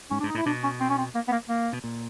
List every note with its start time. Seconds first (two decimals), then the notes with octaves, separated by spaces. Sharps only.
0.11 G#2 C#4
0.20 D4
0.23 G#2
0.29 D#4
0.35 A2 E4
0.46 B2 D4
0.64 C#4
0.80 C4
0.89 C#4
0.98 C4
1.15 A#3
1.28 B3
1.32 A#3
1.49 A#3
1.73 B2
1.84 A#2